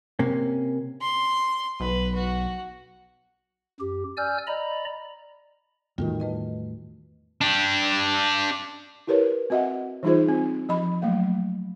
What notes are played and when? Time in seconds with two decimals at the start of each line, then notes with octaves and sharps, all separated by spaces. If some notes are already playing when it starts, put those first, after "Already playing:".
0.19 C3 A#3 C#4
1.01 C6
1.80 B1 B4
2.15 F#4
3.80 F#2 G4
4.17 D5 G#5 E6 F6 G6
4.47 D5 D#5 A#5 B5
5.98 E2 A2 D#3 G3 F4 F#4
6.20 A3 B4 D#5
7.41 D4 G4
9.07 E4 G4 A#4 B4 C#5
9.50 C4 F#4 D#5 E5 F#5
10.03 E3 G3 D#4 F4 G#4 C5
10.28 C4
10.69 F3 D#5 B5
11.02 F#3 A3 A#3 F5